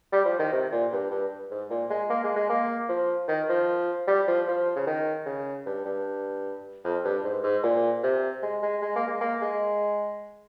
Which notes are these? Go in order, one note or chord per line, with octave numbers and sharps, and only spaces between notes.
G3
F3
D#3
C3
A#2
G2
G2
G#2
A#2
G#3
A#3
G#3
G#3
A#3
F3
D#3
F3
G3
F3
F3
C#3
D#3
C#3
G2
G2
F2
G2
G#2
G#2
A#2
C3
G#3
G#3
G#3
A#3
G#3
A#3
G#3